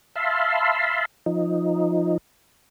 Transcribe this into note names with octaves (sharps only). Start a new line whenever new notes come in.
E5 F5 A5 B5 C6
F3 D#4